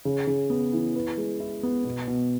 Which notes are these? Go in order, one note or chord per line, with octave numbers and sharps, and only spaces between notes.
C#3
C#3
B3
E3
B4
G#3
E4
B3
B2
B2